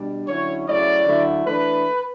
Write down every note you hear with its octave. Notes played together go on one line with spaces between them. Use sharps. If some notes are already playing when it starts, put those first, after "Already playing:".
Already playing: B2 G3 D4
D3 F#3 C#4 E4 C#5
C#3 F#3 A3 C#4 E4 D5
D3 F#3 A3 E4
E3 A3 D4 B4